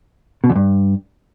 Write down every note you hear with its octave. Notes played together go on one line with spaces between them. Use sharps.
B2
E2
G2